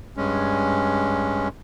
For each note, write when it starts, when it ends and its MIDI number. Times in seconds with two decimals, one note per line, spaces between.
0.17 1.48 43
0.17 1.48 56
0.17 1.48 61